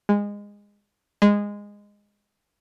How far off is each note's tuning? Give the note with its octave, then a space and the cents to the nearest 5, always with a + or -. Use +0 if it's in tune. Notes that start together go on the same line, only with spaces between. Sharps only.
G#3 -20
G#3 -15